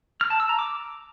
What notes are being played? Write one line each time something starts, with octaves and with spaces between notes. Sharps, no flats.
F6
A5
E6
A#5
D6